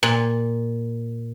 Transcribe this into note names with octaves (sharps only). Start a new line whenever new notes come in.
A#2